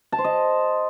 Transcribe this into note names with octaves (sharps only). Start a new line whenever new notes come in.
A5
C5
D#5